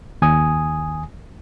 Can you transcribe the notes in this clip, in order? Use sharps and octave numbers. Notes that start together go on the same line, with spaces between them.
D#2 G#5 D#6